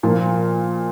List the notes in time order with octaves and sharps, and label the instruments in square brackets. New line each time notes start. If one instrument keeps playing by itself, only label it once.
[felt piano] A#2 F3 A#3